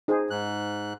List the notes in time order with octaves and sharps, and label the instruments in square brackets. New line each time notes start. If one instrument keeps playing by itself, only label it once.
[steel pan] D#4 G#4 C5
[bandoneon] G#2 F#6